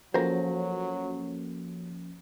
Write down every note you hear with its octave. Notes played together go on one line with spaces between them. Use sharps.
F3 F#3 A#3 C#4 F#4 A4 C5 A#5